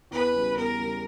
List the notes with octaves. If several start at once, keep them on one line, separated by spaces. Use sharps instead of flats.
E2 B4
C#3 G3
E2 A#4
C#3 G3